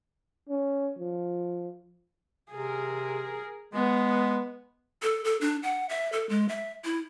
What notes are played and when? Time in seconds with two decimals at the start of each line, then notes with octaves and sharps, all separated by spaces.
0.49 C#4
0.99 F3
2.51 C3 G#4 A#4
3.73 G#3 B3
5.02 A4
5.25 A4
5.41 D4
5.63 F#5
5.89 E5
6.13 A4
6.29 G#3
6.49 E5
6.84 E4